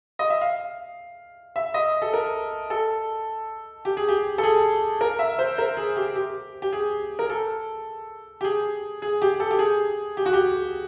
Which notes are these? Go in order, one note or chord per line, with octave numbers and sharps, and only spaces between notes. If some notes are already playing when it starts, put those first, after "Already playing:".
D#5
E5
F5
E5
D#5
A4
A#4
A4
G4
G#4
G4
A4
G#4
A#4
E5
C5
A#4
G#4
G4
G4
G4
G#4
A#4
A4
G4
G#4
G#4
G4
A4
G4
G#4
G4
F#4
G4